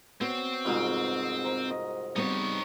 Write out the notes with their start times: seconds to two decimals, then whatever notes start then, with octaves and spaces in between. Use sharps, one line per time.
0.21 B3 C4 F#4 C#5
0.65 C2 F2 G#2 F#4 G#4 B4
1.44 A#4 C5 D6
1.71 D#5
2.16 G3 B3 C4 D#4 C#5